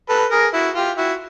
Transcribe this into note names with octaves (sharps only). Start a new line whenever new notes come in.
A4 B4
G#4 A#4
E4 F#4
F4 G4
E4 F#4